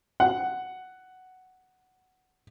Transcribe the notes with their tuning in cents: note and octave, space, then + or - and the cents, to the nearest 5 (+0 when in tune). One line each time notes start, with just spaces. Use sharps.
F#5 +5